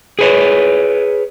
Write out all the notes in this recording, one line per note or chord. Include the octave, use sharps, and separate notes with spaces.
G#4 B4 C#5